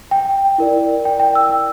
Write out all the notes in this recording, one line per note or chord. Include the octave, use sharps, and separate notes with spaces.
G5
E4 A#4 D5
G5
G5
E6